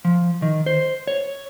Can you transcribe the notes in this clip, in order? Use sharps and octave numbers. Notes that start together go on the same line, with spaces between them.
F3
D#3
C5
C#5